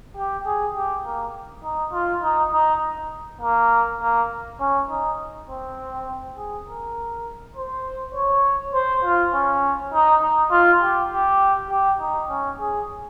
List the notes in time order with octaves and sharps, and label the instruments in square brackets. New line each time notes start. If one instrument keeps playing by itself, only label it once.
[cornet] G4
G#4
G4
A#3
D#4
F4
D#4
D#4
A#3
A#3
C#4
D#4
C4
G#4
A#4
C5
C#5
C5
F4
C#4
D#4
D#4
F4
G4
G4
G4
D#4
C#4
G#4